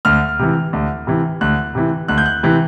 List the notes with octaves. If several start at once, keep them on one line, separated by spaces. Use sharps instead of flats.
D2 F6
C3 E3
D2
C3 E3
D2 F#6
C3 E3
D2 F#6
G6
F#6
C3 E3